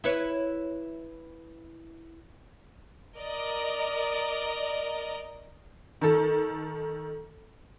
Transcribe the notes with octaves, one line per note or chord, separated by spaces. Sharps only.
E4 B4 C#5
A#4 D5 D#5
D#3 A4